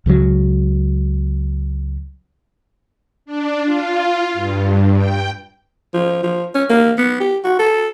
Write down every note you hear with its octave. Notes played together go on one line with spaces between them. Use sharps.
C#2 C#3 F3 F#3
D4
F4
G2
G5
F3
F3
C#4
A#3
B3
G4
F#4
A4